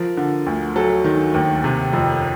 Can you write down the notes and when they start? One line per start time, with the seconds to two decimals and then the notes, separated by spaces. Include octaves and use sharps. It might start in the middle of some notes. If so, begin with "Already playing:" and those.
Already playing: F3 A#4
0.17 D3
0.46 D2
0.76 F#3 A4
1.04 D#3
1.34 D#2
1.64 C3
1.93 F2